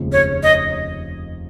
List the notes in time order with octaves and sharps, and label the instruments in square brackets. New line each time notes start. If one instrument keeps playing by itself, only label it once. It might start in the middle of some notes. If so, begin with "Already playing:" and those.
Already playing: [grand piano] F1 D#2 C#3 F3 G#3
[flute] C#5
D#5